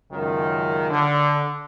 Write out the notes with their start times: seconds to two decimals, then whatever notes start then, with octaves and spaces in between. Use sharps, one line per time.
0.12 C#2 F#2 D#3
0.90 D3